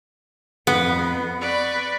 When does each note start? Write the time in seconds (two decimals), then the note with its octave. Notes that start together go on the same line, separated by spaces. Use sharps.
0.67 F2 B3
1.40 B4 D5 C#6